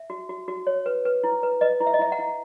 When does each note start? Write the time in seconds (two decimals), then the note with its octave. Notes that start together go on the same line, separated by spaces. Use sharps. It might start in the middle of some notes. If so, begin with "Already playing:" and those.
Already playing: E5
0.10 F#4
0.29 F#4
0.48 F#4
0.67 C#5
0.86 B4
1.05 B4
1.24 E4
1.43 B4
1.61 B4 D#5
1.80 E4
1.87 E5
1.94 D#5
1.99 E4 E5
2.12 F#5
2.19 E4